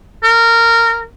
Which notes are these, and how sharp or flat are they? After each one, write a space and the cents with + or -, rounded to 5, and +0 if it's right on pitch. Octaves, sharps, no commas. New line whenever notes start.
A#4 -15